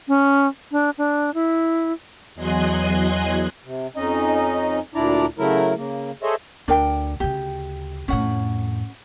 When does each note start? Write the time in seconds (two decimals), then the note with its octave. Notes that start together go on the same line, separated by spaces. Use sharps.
0.08 C#4
0.72 D4
0.98 D4
1.34 E4
2.35 E2 F#3 D#5 G#5 C6 F#6
3.65 C3
3.96 F2 C#4 D#4 D#5
4.95 D2 A#2 D4 E4 D5 A#5
5.38 C#3 F#3 A3 E4 A#4
5.77 C#3 A#3
6.23 G#4 A4 C5 C#5 D#5 E5
6.68 D2 D4 A#4 G5
7.20 D2 C#3 G4
8.08 F2 A2 C#4 F#5